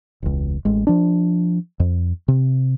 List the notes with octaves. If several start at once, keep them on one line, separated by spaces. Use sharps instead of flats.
E1 C#2
A1 G#3
F3 D4
F2
C3